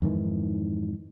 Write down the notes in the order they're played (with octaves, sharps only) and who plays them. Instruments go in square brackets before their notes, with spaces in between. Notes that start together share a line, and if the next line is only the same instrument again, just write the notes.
[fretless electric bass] F2 G#2 D#3 E3